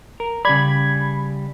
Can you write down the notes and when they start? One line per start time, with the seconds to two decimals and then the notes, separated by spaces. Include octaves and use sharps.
0.20 A#4
0.45 C#3 G3 D5 B5 G#6